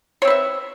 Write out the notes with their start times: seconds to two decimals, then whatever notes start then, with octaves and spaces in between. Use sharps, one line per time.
0.22 C#5
0.25 C4
0.27 B4
0.30 E5